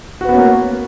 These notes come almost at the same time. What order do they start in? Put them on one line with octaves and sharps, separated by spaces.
F#4 B4 B3 C#4 A#3